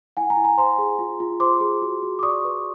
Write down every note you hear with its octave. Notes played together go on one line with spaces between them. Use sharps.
E4 F#5 G#5
G#5 A#5
E4
G#5 A#5
C5 A#5 C6
G#4
F4
F4
C5 C6 D6
G#4
F#4
F#4
D6
D5 C#6 D#6
B4